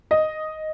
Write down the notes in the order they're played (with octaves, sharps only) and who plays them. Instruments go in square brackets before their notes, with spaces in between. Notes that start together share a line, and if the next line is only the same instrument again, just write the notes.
[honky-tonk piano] D#5